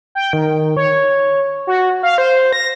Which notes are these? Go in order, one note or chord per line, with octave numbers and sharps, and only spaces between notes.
G5
D#3
C#5
F#4
F5
C5
A#6